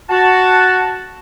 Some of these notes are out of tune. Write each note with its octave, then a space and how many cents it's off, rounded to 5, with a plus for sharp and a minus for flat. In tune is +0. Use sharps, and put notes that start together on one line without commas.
F#4 +0 A5 +0